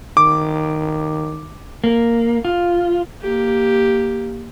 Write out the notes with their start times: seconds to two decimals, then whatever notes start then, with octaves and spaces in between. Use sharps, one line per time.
0.17 D#3 D6
1.84 A#3
2.45 F4
3.21 A#3 G4